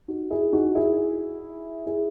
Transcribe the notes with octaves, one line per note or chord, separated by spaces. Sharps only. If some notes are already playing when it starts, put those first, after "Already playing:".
D#4 F#4
E4 G#4
D#4 F#4
E4 G#4
E4 G#4